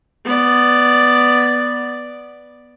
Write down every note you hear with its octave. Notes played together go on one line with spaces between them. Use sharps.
B3 D5